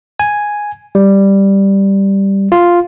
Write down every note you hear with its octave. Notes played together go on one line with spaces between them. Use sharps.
G#5
G3
F4